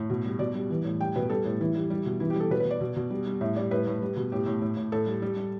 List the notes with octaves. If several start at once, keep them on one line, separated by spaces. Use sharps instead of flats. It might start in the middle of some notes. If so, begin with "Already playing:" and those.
Already playing: A2
B2
G3
B2 D5
G3
E3
A2
G3 G5
B2 B4
G3 A4
A2
E3 E4
G3
G3
B2
E3 E4
G4
G3 A4
B2 B4
B4
B2
D5
B2
B2
G3
G3
A2 E5
G3 D5
A2 B4
A2
G3
B2
A2 G4
A2
A2
A2
A2 A4
G3
G3
G3